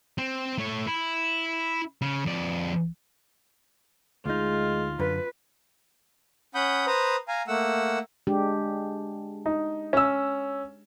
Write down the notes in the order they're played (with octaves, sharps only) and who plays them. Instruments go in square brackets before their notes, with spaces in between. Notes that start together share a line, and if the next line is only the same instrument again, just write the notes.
[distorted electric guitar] C4
A3 C#5
E4
C#3
F2 D5
[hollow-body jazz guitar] D2 D#4 [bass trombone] G#3 [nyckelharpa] F4
[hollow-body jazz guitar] F#2 D3 [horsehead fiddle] B4
[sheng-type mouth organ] C#4 F#5 B5 D#6 G6
B4 C5 A#5 D#6
F5 G#5 A#5
A3 A#3 F#5 E6
[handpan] G#3 D4 G4
[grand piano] D#4
C#4 E6